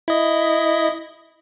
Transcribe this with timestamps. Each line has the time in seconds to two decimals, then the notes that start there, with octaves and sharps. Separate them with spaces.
0.08 E4 D#5